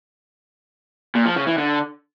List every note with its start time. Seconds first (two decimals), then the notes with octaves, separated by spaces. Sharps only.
1.15 A#2
1.26 F3
1.36 C#3
1.47 E3
1.58 D3